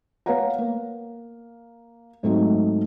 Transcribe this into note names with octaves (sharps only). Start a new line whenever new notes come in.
B3 B4 C#5 F5 F#5 A#5
A#3
G#2 F#3 A3 C4 D#4